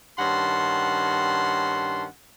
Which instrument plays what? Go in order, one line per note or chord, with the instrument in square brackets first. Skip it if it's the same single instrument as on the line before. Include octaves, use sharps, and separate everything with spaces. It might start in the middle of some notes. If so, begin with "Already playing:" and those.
[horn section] G2 D#3 C#4 F#5 A5 C6